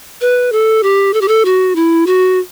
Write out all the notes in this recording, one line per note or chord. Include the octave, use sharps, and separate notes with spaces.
B4
A4
G4
A4
G4
A4
F#4
E4
F#4